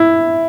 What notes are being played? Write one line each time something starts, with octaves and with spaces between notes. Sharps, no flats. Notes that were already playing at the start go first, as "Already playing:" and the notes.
Already playing: E4